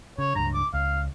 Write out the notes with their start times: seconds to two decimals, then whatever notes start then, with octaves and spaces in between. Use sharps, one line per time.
0.18 C#3 C#5
0.35 C#2 G2 A#5
0.54 D6
0.73 C#2 F5